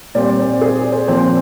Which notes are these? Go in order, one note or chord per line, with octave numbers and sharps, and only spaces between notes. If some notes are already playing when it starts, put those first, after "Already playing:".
A#2 G3 C4 D5
C5
G#4
C5
A#2 F3 C4 C5